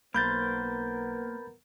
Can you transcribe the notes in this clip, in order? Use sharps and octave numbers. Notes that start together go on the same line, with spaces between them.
B1 A#3 B3 A#4 C5 B5 G6 A6